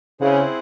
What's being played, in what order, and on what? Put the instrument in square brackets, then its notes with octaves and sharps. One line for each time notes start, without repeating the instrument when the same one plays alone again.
[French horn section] C#3 [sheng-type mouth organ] C4 E4 G#4 C5 F#5